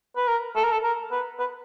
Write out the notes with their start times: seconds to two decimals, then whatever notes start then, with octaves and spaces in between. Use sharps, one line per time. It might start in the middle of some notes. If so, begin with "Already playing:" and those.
0.17 B4
0.28 A#4
0.56 A4
0.64 A#4
0.72 A4
0.84 A#4
1.12 B4
1.39 B4